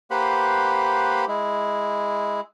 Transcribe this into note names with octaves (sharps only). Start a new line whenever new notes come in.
A#3 G4 B4 C5 F#5 B5
G#3 E4